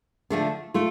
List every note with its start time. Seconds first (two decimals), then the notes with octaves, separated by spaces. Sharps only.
0.30 D3 F3 A3 D4
0.74 A3 F4